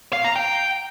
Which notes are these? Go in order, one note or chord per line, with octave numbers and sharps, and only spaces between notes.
F5
A#5
G5